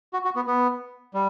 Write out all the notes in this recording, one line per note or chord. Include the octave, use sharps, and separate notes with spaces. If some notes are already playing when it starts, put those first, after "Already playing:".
F#4
F#4
B3
B3
G3